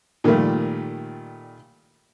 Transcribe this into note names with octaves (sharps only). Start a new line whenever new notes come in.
A#2 D#3 F3 G3 A3